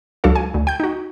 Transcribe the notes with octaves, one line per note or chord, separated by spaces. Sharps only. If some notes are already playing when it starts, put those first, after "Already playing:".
C#2 F#3 D4 F#4 A4 F5
G#5
D2
G5 G6
D#4 F#4